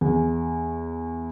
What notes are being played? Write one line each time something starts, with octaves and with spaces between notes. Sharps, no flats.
E2